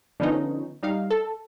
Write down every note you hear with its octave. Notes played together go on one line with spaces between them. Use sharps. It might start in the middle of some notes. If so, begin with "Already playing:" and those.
D3 F3 B3 C#4 D#4
G3 D#4 F5
A4